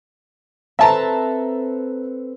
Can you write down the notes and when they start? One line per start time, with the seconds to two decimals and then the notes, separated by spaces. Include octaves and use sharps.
0.79 C4 A4 B4 E5 A5 A#5